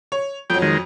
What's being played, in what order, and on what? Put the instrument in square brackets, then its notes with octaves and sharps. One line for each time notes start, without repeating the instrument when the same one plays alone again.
[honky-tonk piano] C#5
[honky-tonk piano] F2 F#3 [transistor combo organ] G5
[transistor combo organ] D#3 G#3